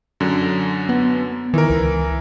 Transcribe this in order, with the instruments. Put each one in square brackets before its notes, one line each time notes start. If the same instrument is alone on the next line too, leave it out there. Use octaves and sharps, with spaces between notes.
[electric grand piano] F#2 D3
[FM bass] B3
[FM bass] D#3 [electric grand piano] E3 A#4
[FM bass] C#2